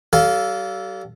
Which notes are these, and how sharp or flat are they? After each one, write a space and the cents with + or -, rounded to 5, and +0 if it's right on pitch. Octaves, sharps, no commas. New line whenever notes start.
G3 -40 A4 +0 F5 +0